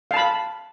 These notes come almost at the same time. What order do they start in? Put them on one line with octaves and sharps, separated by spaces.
F5 A5 B5